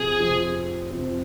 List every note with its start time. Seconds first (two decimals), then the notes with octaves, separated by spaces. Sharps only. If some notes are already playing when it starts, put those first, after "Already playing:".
Already playing: F2 C3 F3 C4 G#4
0.18 F2 C3 F3 C4
0.91 F2 C3 F3 C4